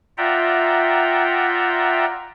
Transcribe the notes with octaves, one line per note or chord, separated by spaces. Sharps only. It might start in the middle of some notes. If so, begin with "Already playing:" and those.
F4 D5 E5 F#5 G5 A#5